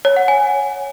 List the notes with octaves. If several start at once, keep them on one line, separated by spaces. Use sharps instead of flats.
C#5
F#5
G#5